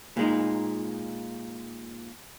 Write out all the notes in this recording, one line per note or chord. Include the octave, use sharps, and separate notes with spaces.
A#2 G#3 D#4